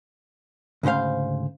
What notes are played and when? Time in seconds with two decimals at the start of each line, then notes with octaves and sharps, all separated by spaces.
0.83 D2 G#2 C#3 C5 F5